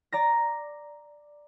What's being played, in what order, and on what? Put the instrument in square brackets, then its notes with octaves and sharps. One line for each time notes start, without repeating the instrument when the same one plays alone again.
[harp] D5 A#5 A#6